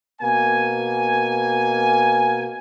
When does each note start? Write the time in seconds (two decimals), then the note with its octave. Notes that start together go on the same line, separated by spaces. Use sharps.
0.22 B2 A#3 G#5